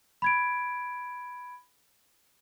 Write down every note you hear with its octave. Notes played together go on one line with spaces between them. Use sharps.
B5 G#6 D7